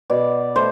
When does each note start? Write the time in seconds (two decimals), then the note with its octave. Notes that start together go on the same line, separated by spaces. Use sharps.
0.10 B2 D5
0.56 A3 C5